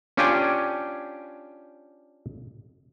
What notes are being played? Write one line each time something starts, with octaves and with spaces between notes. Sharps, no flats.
C#4 D4 F4 G4 G5 G#5